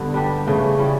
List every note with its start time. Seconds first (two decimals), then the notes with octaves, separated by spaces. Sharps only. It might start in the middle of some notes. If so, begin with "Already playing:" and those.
Already playing: G2 D3 B3
0.14 G3 D4 G4
0.47 C#3 E3 A3
0.78 E3 G3 C#4